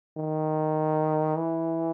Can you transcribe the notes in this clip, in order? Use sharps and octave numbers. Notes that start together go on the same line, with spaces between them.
D#3
E3